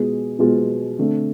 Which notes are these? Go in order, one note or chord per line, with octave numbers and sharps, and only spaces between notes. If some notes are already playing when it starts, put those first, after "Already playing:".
Already playing: B2 G#3 B3 F4 G#4
B2 G#3 B3 F4 G#4
D3 A3 C4